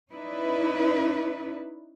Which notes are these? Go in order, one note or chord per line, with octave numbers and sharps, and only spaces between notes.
C#4 D#4 E4 B4 D5